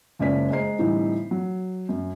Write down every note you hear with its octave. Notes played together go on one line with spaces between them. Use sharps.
F#1 C#2 C#4 D5 G#5 B6
G#3 C5 A#5 C7
A2 D3 E3 G3 C4 D#4
F#3
F#2